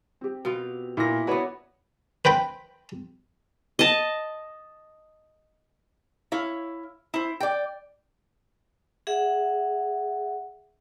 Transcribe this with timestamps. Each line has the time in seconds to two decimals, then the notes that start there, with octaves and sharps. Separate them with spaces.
0.21 C4 G4
0.45 B2 F4
0.97 A#2 E4 A#6
1.27 B3 D4 F#4 B4 C#5
2.25 B4 C5 G5 B5
3.79 D#5 A5
6.32 E4 C#5 F5
7.14 E4 C5
7.40 D5 G5
9.07 G#4 E5 F#5